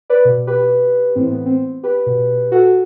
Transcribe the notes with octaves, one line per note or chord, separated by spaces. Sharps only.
B4 D5
B2
G4 B4
A2 E3 C4
B3
C4
G4 B4
B2
F#4 A4